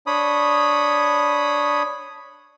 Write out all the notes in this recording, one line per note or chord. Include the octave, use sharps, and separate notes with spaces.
D4 C#5 B5 D#6